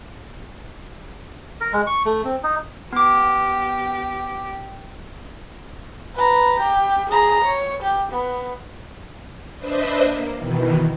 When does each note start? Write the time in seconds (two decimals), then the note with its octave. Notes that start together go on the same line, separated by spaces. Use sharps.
1.61 A#4
1.73 G#3
1.87 C#6
2.05 A3
2.24 C4
2.43 D#4
2.93 B3 G4 D6
6.16 B4 A#5
6.60 G4
7.10 G#4 A#5
7.45 C#5
7.83 G4
8.12 B3
9.56 D4 B4 C5 D#5 E5
10.01 A#3
10.34 B2 D#3 E3